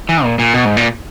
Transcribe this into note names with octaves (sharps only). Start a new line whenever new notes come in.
E3
A#2
A#2
B2
G#2
A#2